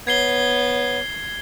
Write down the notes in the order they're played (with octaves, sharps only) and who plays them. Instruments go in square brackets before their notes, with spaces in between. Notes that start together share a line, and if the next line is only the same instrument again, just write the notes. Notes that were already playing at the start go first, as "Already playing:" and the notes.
[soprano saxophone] B3 [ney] C#5 [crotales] G#6 C7 G7